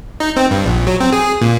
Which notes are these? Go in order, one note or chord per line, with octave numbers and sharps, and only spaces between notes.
D#4
C4
G2
A#1
F#3
C4
G#4
A#2